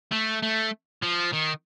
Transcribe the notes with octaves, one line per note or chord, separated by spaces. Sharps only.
A3
A3
F3
D#3